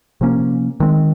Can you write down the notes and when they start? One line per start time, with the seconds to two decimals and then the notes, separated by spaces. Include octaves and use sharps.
0.21 C3 F3 A#3 C#4
0.80 D#3 G#3 C4